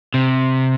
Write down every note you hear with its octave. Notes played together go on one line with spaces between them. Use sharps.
C3